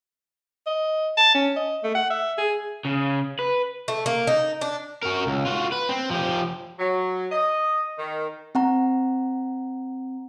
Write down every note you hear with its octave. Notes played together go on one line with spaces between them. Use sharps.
D#5
A5
C#4
D#5
A3
F#5
E5
G#4
C#3
B4
A3
A#3
D#4
D4
F#4 A#4
C#2
F4 F#4
B4
C4
F3 G4
F#3
D#5
D#3
C4 F#5 A#5